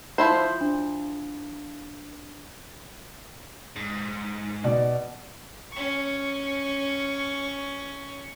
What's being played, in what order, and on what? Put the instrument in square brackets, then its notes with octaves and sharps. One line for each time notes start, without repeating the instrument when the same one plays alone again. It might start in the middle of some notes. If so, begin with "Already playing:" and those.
[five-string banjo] F3 E4 C5 [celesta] G6
[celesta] D4
[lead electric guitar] G#2
[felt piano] B2 D5
[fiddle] C#4 C#6